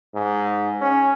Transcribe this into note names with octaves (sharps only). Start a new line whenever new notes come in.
G#2
C#4